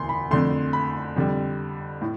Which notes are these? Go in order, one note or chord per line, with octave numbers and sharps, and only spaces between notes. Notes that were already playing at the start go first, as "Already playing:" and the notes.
Already playing: E1 D2 C6
B5
F2 D3 A3 C6
B5
F2 D3 G3
A2